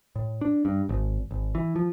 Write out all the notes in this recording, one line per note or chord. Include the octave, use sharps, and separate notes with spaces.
A2
D4
G2
G#1
G#1
E3
F3